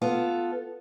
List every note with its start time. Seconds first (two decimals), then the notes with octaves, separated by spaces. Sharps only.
0.02 B3 F4 A4